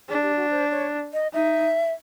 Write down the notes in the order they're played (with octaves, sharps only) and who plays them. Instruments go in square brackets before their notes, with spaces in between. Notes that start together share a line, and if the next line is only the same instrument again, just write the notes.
[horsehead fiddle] D4 [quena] G#4
[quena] G4
F#4
C5
C#5
D#5
[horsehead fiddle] D#4 [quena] E5